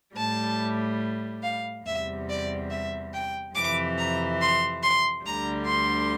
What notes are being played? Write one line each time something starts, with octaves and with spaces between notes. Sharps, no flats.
A2 G3 A5
F5
E2 C3 G3 E5
D5
E5
G5
F2 C3 E3 D6
A#5
C6
C6
D2 D3 G3 A#5
C6